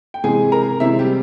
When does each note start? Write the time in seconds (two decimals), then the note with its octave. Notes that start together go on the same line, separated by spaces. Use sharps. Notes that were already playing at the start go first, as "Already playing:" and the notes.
0.14 G5
0.24 C3 E3 G#3 C4 G#4 G#5
0.52 A#4 A#5
0.80 C3 E3 G#3 C4 E4 E5
0.99 G3 G4